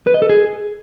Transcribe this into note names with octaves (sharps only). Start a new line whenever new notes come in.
B4
D#5
A4
G#4